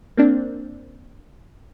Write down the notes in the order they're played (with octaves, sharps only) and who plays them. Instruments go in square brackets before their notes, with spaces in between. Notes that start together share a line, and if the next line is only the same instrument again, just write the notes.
[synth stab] A#3 C4 D4